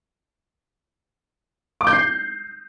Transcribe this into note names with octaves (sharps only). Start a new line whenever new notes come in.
D6
G6
C7